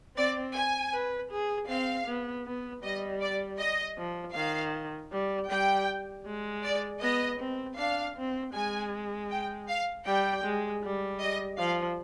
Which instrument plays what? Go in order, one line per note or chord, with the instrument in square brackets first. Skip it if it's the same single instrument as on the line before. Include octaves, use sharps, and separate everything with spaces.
[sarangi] C4 [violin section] D5
[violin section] G#5
[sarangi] B4
G#4
[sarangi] C4 [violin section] F5
[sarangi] B3
B3
[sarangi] G3 [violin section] D#5
[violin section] D5
D#5
[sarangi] F3
[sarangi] D#3 [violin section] F5
[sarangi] G3
[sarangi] G3 [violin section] G5
[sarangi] G#3
[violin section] D5
[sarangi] B3 [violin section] D#5
[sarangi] C4
[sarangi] D4 [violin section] F5
[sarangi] C4
[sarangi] G#3 [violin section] G#5
[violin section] G5
F5
[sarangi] G3 [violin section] G5
[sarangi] G#3
G3
[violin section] D#5
[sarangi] F3 [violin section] F5